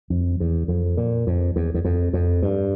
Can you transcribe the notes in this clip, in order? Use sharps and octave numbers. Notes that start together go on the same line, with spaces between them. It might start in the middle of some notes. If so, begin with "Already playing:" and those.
F2
E2
F2
A#2
F2
E2
E2
F2
F2
G2